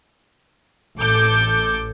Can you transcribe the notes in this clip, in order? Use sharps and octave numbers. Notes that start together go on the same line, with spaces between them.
A1 A4 D6 G6